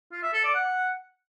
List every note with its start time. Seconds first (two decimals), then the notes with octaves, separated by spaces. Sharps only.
0.12 F4
0.22 E5
0.33 A4
0.44 D5
0.54 F#5